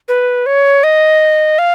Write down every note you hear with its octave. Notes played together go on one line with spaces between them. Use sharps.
B4
C#5
D#5
F5